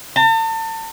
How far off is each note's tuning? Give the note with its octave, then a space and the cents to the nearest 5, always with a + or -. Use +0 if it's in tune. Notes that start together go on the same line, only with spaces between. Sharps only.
A5 +40